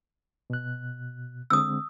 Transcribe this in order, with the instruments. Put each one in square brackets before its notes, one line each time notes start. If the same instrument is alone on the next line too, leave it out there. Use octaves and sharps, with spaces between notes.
[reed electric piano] B2 F#6
[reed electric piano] D3 G#3 C4 [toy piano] D#6 E6